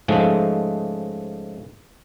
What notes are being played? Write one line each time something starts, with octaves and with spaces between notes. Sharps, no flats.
G#2 C#3 F3 G#3 A3